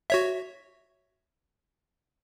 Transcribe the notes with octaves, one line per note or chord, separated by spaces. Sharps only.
F#4 C#5 E5